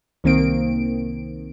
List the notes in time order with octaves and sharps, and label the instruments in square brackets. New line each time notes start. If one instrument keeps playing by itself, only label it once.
[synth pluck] C2 D#3 A#3 C4 D7